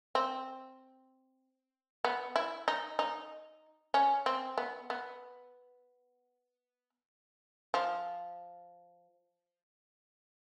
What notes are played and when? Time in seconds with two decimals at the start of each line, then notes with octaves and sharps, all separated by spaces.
0.15 C4
2.04 B3
2.36 E4
2.68 D#4
2.99 D#4
3.94 C#4
4.26 C4
4.58 B3
4.90 B3
7.74 F3